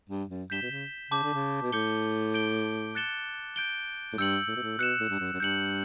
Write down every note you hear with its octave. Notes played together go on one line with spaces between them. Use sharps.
G2
F#2
G2 G6 B6 E7 G7
B2
C#3
C#3 A5 D6 G6
D3
C#3
B2
A2 D6 G6 C#7 G7
G6 D7 G7
F#6 A6 C#7 E7 G7
G6 D7 G7
A2
G2 E6 G6 C#7 F#7
A2
B2
A2
B2 F#6 C#7 E7
A2
G2
F#2
F#2
G2 G6 C#7 F#7